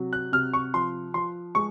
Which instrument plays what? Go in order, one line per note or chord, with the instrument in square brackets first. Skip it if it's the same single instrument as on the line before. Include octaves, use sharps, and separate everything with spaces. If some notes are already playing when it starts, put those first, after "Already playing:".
Already playing: [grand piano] C3 F#3
F#6
C3 F6
C#6
F3 C6
F3 C6
G#3 C#6